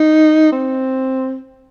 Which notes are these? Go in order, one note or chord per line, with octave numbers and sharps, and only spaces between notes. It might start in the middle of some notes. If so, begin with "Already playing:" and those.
Already playing: D#4
C4